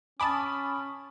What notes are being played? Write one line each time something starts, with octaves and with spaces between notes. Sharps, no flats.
C#4 G#5 A5 B5 D6 D#6